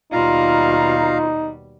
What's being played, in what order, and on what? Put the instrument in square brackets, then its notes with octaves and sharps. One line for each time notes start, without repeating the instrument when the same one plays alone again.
[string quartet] D#2 B2 G3 [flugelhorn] D#4 [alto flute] F4 [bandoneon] F5 A#5